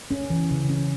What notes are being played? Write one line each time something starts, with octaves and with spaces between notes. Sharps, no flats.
C#4
E3
C#3
C#4